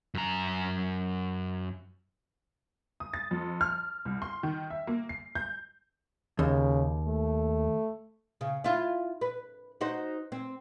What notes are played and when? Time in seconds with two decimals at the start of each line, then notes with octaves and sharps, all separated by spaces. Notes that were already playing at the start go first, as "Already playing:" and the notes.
0.15 F#2 A#5
3.00 D#6
3.14 A6
3.31 F2
3.61 F6
4.05 C2
4.22 C6
4.43 D#3
4.70 E5
4.87 A#3
5.09 C7
5.35 G6
6.39 D#2 C#3
7.07 A3
8.41 C#3
8.64 E4 F4
9.21 B4
9.81 D#4 F#4 C5
10.32 C4